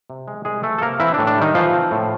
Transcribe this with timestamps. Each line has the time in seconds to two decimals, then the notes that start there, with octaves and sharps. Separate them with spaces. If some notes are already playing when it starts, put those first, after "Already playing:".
0.10 C3
0.28 G#3
0.45 C2 G#3 G#4
0.63 E3 A3 A4
0.78 A4
0.82 C3 A#3 A#4
1.00 E3 C4 E4
1.14 D4
1.19 A2
1.27 D4
1.37 D#3 G3 D#4
1.55 E3 F3 F4
1.73 C4
1.91 A2